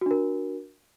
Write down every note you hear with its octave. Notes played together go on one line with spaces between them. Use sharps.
D4 F#4 A#4